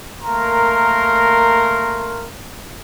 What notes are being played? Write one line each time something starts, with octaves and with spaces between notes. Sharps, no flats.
A3 A#3 A#4 A#5 C6